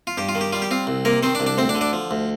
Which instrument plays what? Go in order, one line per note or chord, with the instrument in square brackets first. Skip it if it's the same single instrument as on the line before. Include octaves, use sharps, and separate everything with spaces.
[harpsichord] F4
G2 G4
F4
D#3
G4
G3 F4
G4
C4 F4
C2
C3 A#3 A#4
D#3 C4 C5
D4 D5
C2
D4 D5
D2 C4 C5
D4 D5
D3
D4 D5
F3
D2